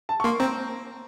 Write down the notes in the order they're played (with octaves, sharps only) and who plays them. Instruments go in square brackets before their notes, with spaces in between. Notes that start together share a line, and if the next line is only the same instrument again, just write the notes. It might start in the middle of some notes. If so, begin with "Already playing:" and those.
[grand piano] A5
C#6
[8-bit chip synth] A#3 [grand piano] C6
[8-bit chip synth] C4 [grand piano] A#5